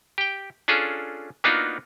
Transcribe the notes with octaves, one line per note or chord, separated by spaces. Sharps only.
G4 G5
C#4 D4 F4 G#4 A4
A#3 B3 D4 D#4 F4 F#4